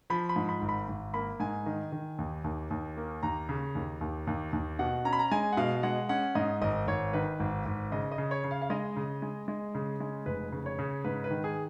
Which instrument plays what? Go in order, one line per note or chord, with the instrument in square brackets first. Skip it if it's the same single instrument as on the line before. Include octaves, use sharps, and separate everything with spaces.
[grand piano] F3 B5
B5
G#2
B5
G#1
B5
G#1
A#3 B5
G#2 G#5
D#3
D#3
D#2
D#2
D#2
A#3
D#2 A#5
C#3
D#2
D#2
D#2
D#2
B2 F#5
C#4 A#5
B5
A#5
G#3 G#5
F#5
B2 F5
G#3 F#5
C#4 F#5
G#2 D#5
G#1 D#5
G#1 C#5
D#3 B4
G#1
G#1
C#3 D#5
D#5
C#3
C#5
C#3
F5
F5
G#3 D#5
C#3
G#3
G#3
C#3
G#3
F1 B4
C#3
C#5
C#3
G#2 B4
B4
D#3
G#4